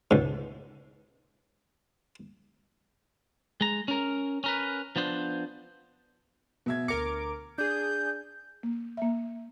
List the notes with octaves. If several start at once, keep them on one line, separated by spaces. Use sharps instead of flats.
C#2 G#2
G#3 A#5
C#4 A#4
C#4 A#4 B4
F3 B3 D4 C5
B2 E5 G#6
D2 A#4 D6 C#7
D4 G#4 G6
A#3
A#3 E5